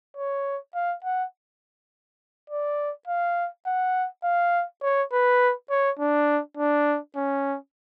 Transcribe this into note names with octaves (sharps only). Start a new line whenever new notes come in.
C#5
F5
F#5
D5
F5
F#5
F5
C#5
B4
C#5
D4
D4
C#4